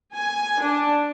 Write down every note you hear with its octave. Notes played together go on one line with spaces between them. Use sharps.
G#5
D4